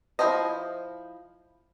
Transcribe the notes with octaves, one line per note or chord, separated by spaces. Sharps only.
F3 E4 C5 D#5